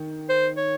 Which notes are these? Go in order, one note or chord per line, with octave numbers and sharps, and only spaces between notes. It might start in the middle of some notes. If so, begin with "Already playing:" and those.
Already playing: D#3
C5
C#5